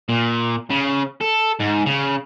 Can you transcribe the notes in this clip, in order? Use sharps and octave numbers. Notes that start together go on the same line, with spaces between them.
A#2
C#3
A4
G#2
C#3